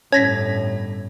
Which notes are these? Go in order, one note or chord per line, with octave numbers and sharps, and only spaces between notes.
G1 A2 C#4 C#5 G#6 A#6 B6